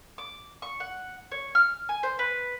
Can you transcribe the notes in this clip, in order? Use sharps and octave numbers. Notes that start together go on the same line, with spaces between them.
D6
C#6
F#5
C#5
F6
G#5
C5
B4